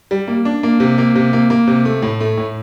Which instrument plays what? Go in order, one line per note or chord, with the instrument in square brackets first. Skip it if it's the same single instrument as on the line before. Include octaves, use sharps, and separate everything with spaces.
[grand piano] G3
A#3
D4
A#3
C3
A#3
C3
A#3
A#3
C3
A3
A2
A3
A2